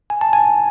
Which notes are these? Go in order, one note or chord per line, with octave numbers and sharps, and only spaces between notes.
G#5
A5
G#5